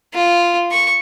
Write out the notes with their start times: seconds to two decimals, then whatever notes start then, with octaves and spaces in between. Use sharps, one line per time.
0.14 F4
0.71 C#6